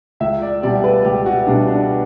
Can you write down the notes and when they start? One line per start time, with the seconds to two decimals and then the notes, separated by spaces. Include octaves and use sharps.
0.20 C#2 E5
0.42 D5
0.63 B2 G3 D5
0.84 B4
1.04 C#2 G4
1.26 F#4
1.47 B2 G3 D4
1.67 D4